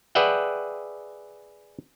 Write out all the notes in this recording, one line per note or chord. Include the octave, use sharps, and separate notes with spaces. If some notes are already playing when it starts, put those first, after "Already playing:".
G#4 B4 D5 E5 F#5 G5